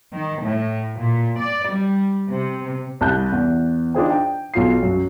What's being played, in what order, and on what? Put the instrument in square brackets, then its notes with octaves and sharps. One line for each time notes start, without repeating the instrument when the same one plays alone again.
[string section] D#3
A2
A#2
D5
G3
C3
[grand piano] C2 A5 F#6 G6
E2
D4 D#4 F4 G#4 C5 G5
G5
B1 F4 C7
F#2